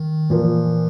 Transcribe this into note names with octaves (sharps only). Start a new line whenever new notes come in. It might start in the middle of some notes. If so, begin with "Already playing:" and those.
Already playing: D#3
A#2 E3 F3 A#3